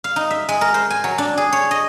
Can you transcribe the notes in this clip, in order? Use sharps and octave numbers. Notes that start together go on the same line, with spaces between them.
F5
D#4
E5
G#3
A#4
C5
G#5
F#3
D4
G#4
C#5
D#5